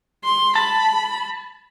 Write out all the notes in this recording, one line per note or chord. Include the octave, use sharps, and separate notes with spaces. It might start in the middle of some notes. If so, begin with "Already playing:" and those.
C6
A5 B5